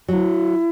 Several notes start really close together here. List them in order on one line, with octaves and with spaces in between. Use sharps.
F#3 F#4 E4